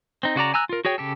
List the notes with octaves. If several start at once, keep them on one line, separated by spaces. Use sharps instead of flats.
C4 D#4
C#3 F#4 D5 A#5
G#5 A#5 E6 F#6
F4 A#4
F#4 G#4 C#5 G5
C#3 G4 A4